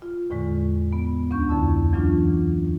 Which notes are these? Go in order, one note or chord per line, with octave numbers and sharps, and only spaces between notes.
F4
E2 A2 D3 G#3
B3
D2 C#4 D4 C#6 G6
F2 D3 E4 A5
E3 F#3 C#4 D4 F4